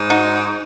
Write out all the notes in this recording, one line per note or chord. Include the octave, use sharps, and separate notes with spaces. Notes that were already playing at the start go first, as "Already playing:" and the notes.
Already playing: G#2
D#4 F#4